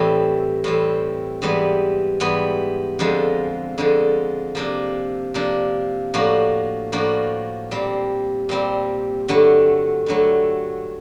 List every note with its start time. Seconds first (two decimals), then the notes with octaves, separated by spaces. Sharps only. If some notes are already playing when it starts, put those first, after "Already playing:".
Already playing: A2 E3 G3 C4
0.64 A2 E3 G3 C4
1.42 G#2 E3 G3 B3
2.20 G#2 E3 G3 B3
2.99 F2 D3 F3 G#3
3.78 F2 D3 F3 G#3
4.55 C3 F3 A#3 D4
5.34 C3 F3 A#3 D4
6.14 A2 F3 A#3 D4 F#4
6.92 A2 F3 A#3 D4 F#4
7.71 A#2 G3 C4
8.49 A#2 G3 C4
9.28 G2 D3 F#3 A3
10.06 G2 D3 F#3 A3